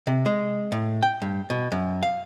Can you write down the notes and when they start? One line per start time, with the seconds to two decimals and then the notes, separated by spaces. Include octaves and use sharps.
0.07 C3
0.26 G#3
0.72 A2
1.03 G5
1.22 G2
1.50 B2
1.72 F#2
2.03 F5